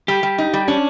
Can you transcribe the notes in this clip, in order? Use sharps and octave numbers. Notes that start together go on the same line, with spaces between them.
G3 G4
G3
D#4
G3
C#4 D4